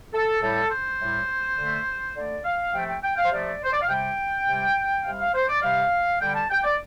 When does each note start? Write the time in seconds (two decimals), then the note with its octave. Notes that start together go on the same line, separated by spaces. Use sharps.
0.13 A4
0.41 A2 G3 A4
0.70 C5
1.00 A2 G3
1.57 D3 A3
2.15 D3 A3 D5
2.45 F5
2.73 C3 F3 A3 G5
2.88 G5
3.03 G5
3.16 F5
3.25 C5
3.31 C3 F3 A3 D5
3.64 C5
3.72 D5
3.81 F5
3.89 C3 G3 G5
4.47 C3 G3
5.04 C3 G3 F5
5.20 F5
5.34 C5
5.48 D5
5.62 C3 G3 F5
6.21 D3 G3 G5
6.35 A5
6.50 G5
6.64 D5